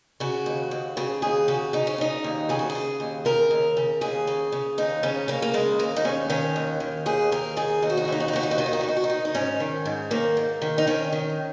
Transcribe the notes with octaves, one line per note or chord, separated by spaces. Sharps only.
C#3 F#4
D#2
D#2
C#3 G#4
D#2 G#4
C#3 F#4
C#3 D#4
C#4
C#3 D#4
D#2
C#3 G#4
F#4
G#4
C#3
D#2
C#3 A#4
D#2
C#3
D#2 G#4
C#3
C#3
D#2 D#4
C#3 C#4
C#3 A#3
A#3
C#3 G#3
D#2 A#3
D#4
D#2 C#4
D#3 C#4
D#2
D#3
D#2 G#4
D#2 A#4
D#3 G#4
D#2 D#4
F#4
D#4
F#4
D#2 D#4
F#4
D#4
D#2 F#4
D#4
F#4
D#3 D#4
F#4
D#4
F#4
D#3 D#4
F#4
D#4
D#3
D#4
G#2 C#4
D#3
G#2
D#3 A#3
G#2
D#3
D#4
D#3 C#4
D#3